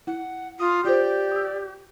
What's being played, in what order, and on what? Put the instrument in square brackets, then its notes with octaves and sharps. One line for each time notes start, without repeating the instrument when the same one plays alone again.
[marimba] E4 [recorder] F#5
[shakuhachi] F4 [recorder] D#6
[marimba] F4 C5 [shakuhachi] G4 [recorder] D5
[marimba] D#6 E6